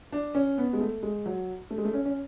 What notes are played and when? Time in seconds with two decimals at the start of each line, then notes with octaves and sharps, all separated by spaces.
0.12 D4
0.35 C#4
0.58 B3
0.73 G#3
0.81 A3
1.03 G#3
1.26 F#3
1.70 A3
1.78 G#3
1.85 A3
1.93 C#4
2.05 C#4